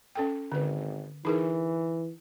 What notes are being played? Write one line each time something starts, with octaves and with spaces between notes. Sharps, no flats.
C#4 A4 G5
G#1 D3 B4
E3 D#4 G#4 A#4